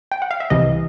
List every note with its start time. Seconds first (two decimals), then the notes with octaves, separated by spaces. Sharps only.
0.12 G5
0.22 F#5
0.31 F5
0.40 E5
0.50 C2 C3 E3 D#5